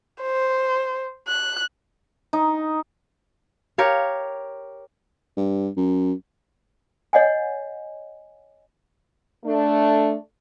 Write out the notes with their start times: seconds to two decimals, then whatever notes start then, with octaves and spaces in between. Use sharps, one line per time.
0.22 C5
1.27 F#6
2.33 D#4
3.78 G4 A#4 C#5 F5
5.37 G2
5.77 F#2
7.13 C#5 D#5 F#5 G#5
9.45 A3 D4